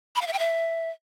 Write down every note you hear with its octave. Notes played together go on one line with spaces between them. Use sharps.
B5
F5
E5
G5
E5